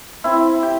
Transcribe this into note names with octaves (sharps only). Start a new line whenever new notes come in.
C4 E4
G4